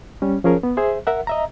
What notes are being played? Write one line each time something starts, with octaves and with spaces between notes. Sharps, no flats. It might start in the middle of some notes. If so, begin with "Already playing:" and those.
G3 C#4
F3 C#4 G#4 A#4 C#5
B3
G#4 C5 E5
A#4 E5 F#5
D#5 E5 A#5